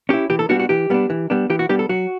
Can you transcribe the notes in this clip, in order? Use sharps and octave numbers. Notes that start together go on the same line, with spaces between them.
C#4 E4 G4
E3 G4
A4
G3 B3 D4 F#4
F#4
E3 G4
G3 B3 D4
E3
G3 B3 D4
E3 G4
F#4
G3 B3 D4 G4
A4
F#3 F#4